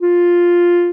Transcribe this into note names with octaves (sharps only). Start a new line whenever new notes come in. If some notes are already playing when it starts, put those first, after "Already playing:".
F4